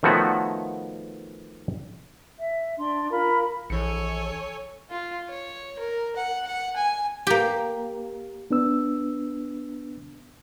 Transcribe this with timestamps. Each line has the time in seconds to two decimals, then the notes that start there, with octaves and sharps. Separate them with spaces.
0.03 D#3 F3 A3 B3 F#4 C#5
2.38 E5
2.79 D4 C6
3.10 F4 A#4 B5
3.70 A#1 E3 A4 C#5 G#5 C#7
4.90 F4
5.29 C#5
5.79 A#4
6.16 F#5
6.47 F#5
6.76 G#5
7.27 A#3 G4
8.51 B3 D4 B4 E6